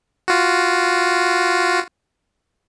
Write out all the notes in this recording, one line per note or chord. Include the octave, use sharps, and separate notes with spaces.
F4 F#4